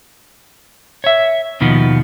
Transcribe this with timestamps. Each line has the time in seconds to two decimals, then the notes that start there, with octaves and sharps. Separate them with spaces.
1.04 C#5 E5
1.61 D#2 B2 D#3 F3 B3